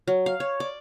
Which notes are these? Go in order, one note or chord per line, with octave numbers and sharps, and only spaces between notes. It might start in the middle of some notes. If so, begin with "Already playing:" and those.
F#3
F5
C#5
D5